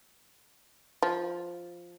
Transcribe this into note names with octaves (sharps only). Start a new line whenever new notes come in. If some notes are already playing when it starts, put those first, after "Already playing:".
F3